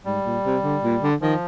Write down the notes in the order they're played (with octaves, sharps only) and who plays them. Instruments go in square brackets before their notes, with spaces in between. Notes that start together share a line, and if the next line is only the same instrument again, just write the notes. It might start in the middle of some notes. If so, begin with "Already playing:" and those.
[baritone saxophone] G#2 [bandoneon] G3
[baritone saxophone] A#2
C3
D3
A#2
D3
[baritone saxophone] D#3 [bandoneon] F3